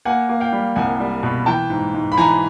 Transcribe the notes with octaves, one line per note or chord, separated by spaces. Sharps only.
A#3 F#5 G#5
A#3
F5 G5
G3
C2 F#5 G#5
G3
B2
E3 G5 A5
G#2
G#2
B5
E3 G#5 A#5